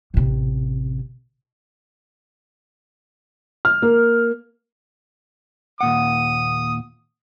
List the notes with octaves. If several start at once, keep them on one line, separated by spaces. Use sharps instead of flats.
A1 C3
F6
A#3
D#2 A#2 F#5 D#6